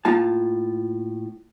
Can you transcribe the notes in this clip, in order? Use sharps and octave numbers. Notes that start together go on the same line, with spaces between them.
A2 A#3 F4 A5